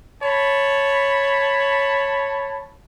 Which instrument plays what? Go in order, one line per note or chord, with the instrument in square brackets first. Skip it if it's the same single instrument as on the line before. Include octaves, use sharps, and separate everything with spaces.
[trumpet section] C#5 A5 B5